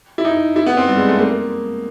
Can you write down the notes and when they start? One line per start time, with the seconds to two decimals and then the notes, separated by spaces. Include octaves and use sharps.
0.18 E4
0.25 D#4
0.56 E4
0.66 B3
0.77 C4
0.88 G3
0.97 G#3
1.08 A3
1.18 A#3